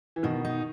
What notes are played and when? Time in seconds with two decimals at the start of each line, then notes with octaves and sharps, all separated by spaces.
0.16 E3
0.23 B2 D#3
0.45 D#4